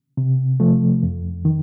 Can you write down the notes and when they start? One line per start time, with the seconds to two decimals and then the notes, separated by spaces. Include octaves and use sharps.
0.17 C3
0.60 F3 A3
1.03 F2
1.45 D#3